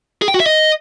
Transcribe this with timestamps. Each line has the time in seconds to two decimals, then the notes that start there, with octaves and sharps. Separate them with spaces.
0.22 G#4
0.28 G5
0.34 F#4
0.40 E5
0.46 D#5